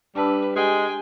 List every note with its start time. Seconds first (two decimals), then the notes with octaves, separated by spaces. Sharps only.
0.15 G3 D4 B4 A5 E6
0.56 G#3 G4 G5 G#5